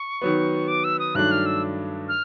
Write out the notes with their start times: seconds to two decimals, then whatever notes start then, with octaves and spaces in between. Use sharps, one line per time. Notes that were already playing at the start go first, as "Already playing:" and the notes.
Already playing: C#6
0.21 D#3 F#3 B3
0.68 D6
0.84 E6
0.99 D#6
1.15 G2 D#3 F#3 A3 D4 F#6
1.31 F6
1.46 E6
2.09 F6